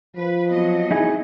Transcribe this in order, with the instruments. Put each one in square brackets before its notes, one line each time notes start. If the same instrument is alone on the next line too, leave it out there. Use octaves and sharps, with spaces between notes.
[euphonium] F3 [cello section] B4
[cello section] F#3 D#5 [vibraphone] B3 C4
[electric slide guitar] D#4 E4 G#4